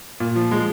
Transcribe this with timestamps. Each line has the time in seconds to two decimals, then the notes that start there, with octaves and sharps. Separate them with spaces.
0.20 A#2
0.35 F3
0.51 G#3